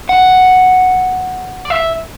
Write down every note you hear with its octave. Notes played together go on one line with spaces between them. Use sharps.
F#5
D5
E5